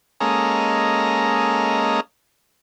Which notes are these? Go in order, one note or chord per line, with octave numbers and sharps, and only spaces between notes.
G#3 A#3 C#4 A4 D#5 A#5